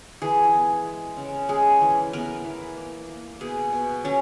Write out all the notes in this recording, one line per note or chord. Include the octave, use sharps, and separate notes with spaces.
E3 G#4
B3
G#3
C#3
G#3 G#4
E3
B3 A#4
E3
A#3
A#3
B2 G#4
B2
F#3 C#4